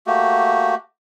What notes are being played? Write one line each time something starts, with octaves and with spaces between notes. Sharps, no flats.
A3 A#3 F#4 G4